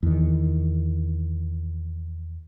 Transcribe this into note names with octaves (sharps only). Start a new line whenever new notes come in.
E2 D#3